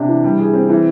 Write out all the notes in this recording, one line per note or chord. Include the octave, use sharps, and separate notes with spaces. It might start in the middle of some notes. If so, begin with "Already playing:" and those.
Already playing: C3 D4
E3
G3
G#4
C4
E3